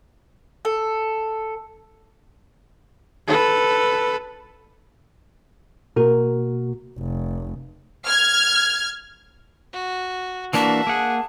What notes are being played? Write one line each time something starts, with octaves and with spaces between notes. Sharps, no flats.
A4
A4 B4
B2 A#3 F#4 A#4
F1
F6 G#6
F#4
E3 A#3 D4 F#4 E5 A5
A#3 G#4 F#5